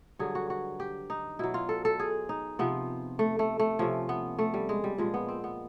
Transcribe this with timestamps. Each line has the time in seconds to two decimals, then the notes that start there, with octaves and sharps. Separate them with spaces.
0.19 G2 D3 F#3 G#4
0.35 F#4
0.50 F#4
0.80 G4
1.10 D#4
1.39 B2 F#3 E4
1.54 F4
1.69 A4
1.85 A4
2.00 G#4
2.29 D#4
2.59 C3 F3 B3
3.19 A3
3.39 A3
3.59 A3
3.79 C3 F3 C#4
4.09 B3
4.39 A3
4.54 G3
4.69 G#3
4.84 G3
4.98 A#2 F3 G#3
5.14 B3
5.28 C4
5.44 B3